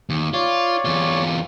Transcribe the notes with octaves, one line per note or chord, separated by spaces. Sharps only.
D#2
F4 C#5 D5
E2 F4